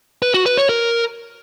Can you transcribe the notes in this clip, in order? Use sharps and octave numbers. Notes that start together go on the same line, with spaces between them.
B4
F#4
B4
C#5
A#4